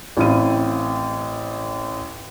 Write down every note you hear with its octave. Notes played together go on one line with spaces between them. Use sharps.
A1 C4 E4 F5 D#7